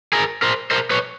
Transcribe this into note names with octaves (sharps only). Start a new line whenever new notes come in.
G#4 A#4
A#4 C5
A#4 C5
B4 C#5